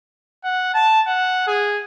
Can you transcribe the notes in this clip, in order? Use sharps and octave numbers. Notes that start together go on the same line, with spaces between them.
F#5
A5
F#5
G#4